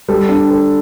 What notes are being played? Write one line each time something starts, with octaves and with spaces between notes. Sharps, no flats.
G3 A4
D4
A4